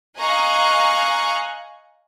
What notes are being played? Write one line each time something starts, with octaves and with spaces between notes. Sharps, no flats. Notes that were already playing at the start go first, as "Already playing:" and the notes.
D#5 F5 G#5 A#5 C#6 F#6